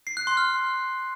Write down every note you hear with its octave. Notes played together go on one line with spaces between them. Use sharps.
C7
F#6
C6
F6